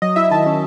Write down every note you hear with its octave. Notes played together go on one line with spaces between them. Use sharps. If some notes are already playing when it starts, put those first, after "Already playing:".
F#3 D#5
E4 E5
D#3 A5
C#4